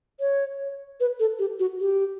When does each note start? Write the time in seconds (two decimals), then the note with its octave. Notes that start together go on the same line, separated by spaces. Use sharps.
0.20 C#5
1.00 B4
1.20 A4
1.39 G4
1.59 F#4
1.80 G4